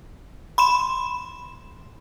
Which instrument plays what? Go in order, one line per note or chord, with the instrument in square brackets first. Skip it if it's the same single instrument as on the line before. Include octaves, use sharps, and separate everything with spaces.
[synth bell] B5 C6 E7